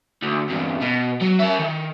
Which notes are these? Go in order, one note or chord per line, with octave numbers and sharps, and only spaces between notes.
D2
E2 G2
B2
F#3
A#4 E5
D#3